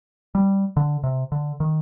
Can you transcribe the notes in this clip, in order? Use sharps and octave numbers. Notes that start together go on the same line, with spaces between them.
G3
D3
C3
D3
D#3